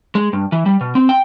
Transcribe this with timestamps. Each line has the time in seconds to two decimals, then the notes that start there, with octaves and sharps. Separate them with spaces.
0.15 G#3
0.33 G2
0.52 E3
0.66 G3
0.81 B2
0.95 C4
1.09 G5